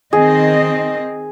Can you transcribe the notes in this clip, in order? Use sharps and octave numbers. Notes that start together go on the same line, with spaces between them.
D#3 C4 G#4 D#5